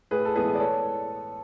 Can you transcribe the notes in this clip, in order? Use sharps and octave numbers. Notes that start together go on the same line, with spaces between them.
A2 G#4 B4
A4
E3 G#3 B3 G#4 B4
D5
A4 C#5